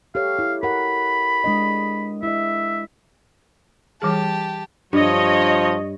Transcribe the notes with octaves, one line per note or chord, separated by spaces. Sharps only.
G4 A4 C#5 F5
E4
A#4 F#5 B5
G#3 D4 D#5
E4 D#5 E5
E3 G3 G4 G#4 A5
G2 F3 C#5 D#5